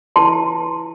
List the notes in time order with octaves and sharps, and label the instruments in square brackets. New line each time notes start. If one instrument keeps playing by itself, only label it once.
[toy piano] E4 B4 A5 C6